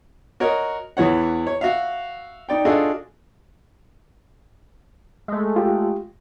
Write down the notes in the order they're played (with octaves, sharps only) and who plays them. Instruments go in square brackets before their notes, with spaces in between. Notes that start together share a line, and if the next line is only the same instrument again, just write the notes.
[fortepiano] F#4 A#4 C#5 D#5
E2 E3 C#5 F#5
C#5
F#4 E5 F5
D#4 D5 G5
D4 F4 F#4 G#4 A4 D#5
[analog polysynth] G#3 A3
[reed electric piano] F4 G4